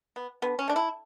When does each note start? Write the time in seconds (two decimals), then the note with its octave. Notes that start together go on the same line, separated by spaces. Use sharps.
0.16 B3
0.42 D3 B3
0.59 C#4
0.68 A3 D4
0.76 E4